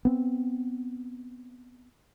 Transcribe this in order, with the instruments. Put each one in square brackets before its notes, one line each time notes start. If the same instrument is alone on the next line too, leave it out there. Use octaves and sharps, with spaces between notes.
[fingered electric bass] B3 C4